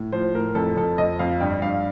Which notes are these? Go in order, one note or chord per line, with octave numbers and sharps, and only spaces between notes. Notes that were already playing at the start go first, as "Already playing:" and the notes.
Already playing: A2
F3 C5
A2 A#4
F2 A4
F2 A4
F2 D#5
F2 F5
G2 G5
G2 F5